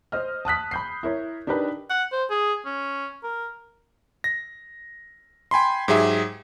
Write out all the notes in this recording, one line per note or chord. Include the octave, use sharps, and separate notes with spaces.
C5 D#5 F6
A5 D#6 F#6 B6
B5 G6 C7
E4 A#4 C#5
D4 D#4 G4 A#4 B4
F#5
C5
G#4
C#4
A#4
A#6
G5 G#5 B5 C6
G#2 F#3 G4 G#4 E5